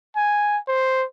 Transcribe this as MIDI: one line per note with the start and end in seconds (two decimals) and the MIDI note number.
0.16 0.58 80
0.68 1.05 72